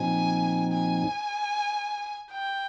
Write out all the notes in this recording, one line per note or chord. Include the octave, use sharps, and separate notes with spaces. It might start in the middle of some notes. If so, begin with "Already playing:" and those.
Already playing: A#2 F3 C4 D#4 G#5
G#5
G5